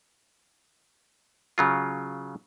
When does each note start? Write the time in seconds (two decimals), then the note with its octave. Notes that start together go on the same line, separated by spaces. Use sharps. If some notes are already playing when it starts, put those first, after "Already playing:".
1.58 C#3 F#3 F4